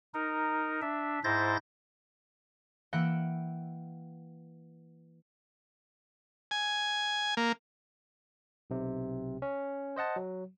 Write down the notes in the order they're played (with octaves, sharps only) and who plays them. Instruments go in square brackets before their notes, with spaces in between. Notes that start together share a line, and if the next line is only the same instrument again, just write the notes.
[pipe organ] D#4 A#4
D4 E5
G#2 E4 C5 G6 A6 A#6
[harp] E3 A#3 F#5 G5 E6 F#6
[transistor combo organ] G#5
A#3
[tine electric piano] B1 C3
C#4
C5 D#5 F#5 A5
F#3